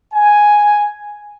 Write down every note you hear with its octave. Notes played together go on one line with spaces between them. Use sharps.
G#5